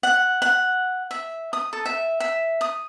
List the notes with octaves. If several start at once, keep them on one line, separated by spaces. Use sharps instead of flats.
F#5
F#5
E5
D#6
A4
E5
E5
D#6